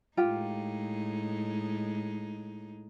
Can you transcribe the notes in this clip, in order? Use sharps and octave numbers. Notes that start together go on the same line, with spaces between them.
A2 G#3 D#4 F4 G4